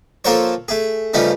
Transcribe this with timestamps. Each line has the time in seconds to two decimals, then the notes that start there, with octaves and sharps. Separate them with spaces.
0.25 F3 A#3 A4 A#4 C5 C#5
0.68 A3 G#4
1.14 G2 C#3 F3 A3 C#4 D#4